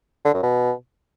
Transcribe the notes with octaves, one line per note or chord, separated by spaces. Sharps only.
D3
F#2
B2